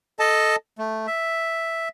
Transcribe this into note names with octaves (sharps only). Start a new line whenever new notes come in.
A4 D#5 A5
A3
E5